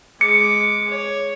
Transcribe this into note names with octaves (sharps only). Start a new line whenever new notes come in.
G#3 D6 C#7
C#5